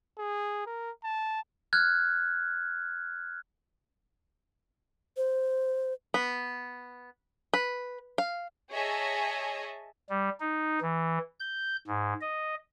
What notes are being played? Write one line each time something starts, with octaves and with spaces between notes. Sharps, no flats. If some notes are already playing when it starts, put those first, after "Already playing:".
G#4
A#4
A5
F6 F#6 G#6
C5
B3
B4
F5
G#4 C#5 D#5 E5 G#5 A5
G3
D#4
E3
G6
G#2
D#5